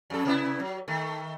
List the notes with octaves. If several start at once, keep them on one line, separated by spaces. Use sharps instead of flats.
F2 A4
C3 B3 E4
F#3
D#3 A3